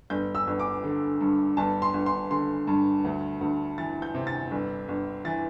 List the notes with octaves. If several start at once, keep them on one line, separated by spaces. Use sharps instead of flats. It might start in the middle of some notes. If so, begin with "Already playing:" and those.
G1 G6
E6
G1
D6
D3
G2
G1 A5
C6
G1
C6
D3 C6
G2
D2
D2
E3 A6
G6
C3
A6
G1
G1
E3 A6